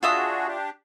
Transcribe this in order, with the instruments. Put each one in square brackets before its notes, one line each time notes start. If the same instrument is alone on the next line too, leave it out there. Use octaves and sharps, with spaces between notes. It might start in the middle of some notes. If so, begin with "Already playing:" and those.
[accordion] D4 F#4 G#4 [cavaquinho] F4 E5 D#6
[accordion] D4 G4